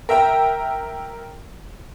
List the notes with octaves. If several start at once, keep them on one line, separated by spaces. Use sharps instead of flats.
A#4 E5 G5 A#5